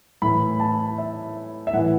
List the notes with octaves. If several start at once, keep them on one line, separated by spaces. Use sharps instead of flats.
A2 E3 B5
A5
E5
E5
A2 E3 F#5